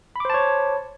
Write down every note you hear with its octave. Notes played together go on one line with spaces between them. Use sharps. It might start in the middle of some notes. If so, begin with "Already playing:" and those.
C5 C#5 A5 B5 D6